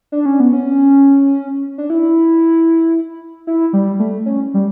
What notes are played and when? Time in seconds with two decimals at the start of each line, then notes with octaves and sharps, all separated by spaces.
0.12 D4
0.26 C#4
0.40 B3
0.53 C#4
1.78 D4
1.90 E4
3.47 E4
3.73 G3
3.99 A3
4.26 C#4
4.54 G3